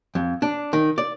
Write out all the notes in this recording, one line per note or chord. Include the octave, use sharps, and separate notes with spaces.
F2
D4
D#3
D5